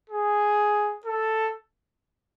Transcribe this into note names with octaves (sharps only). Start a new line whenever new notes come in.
G#4
A4